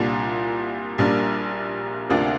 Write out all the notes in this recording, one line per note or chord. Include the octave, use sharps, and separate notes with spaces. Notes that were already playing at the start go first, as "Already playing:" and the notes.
Already playing: C2 A#2 G3 D4 F4
A#1 A#2 G3 A#3 D4
D2 C3 A#3 D4 F4